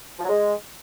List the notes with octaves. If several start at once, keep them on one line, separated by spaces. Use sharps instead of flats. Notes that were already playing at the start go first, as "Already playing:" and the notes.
F3
F#3
G#3